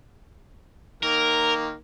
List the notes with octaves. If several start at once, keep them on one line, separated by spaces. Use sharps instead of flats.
D#3 A#3 A#4